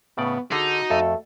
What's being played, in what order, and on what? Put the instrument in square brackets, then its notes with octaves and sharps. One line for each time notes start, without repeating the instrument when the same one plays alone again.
[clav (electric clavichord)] A2 C#3 D5 [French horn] B3
[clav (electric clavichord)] D3 G#4 A4 [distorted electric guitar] D#4 [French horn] F#4
[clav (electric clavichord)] F2 A4 [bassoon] A3